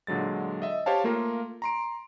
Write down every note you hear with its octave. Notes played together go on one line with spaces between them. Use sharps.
A#2 D3 F#3 G#3 A6
D#5 E5
G4 C5 C#5 F5 A5
A3 A#3 F4 A#4
A#5 C6 D7